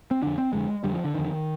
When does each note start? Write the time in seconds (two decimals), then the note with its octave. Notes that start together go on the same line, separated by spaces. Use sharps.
0.11 C4
0.22 F2 D3 D4
0.38 C4
0.53 F2 D3 G#3
0.84 F2 D3 G3
0.94 F3
1.04 D3
1.14 F2 D3 D#3